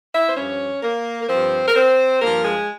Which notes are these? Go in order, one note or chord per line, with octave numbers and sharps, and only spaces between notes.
E4 E5
C5
G2 F3 C#4 C#5
A#3 A#4
A#4
G2 F3 C4 C5
A#4
C4 C5
G2 F3 A#3 A#4
G#3 G#4